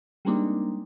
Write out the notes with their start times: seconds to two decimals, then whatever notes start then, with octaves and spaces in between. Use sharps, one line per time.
0.25 G3 G#3 A#3 C4 D4 D#4